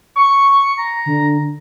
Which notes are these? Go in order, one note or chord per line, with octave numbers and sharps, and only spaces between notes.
C#6 C#7
A#5
D3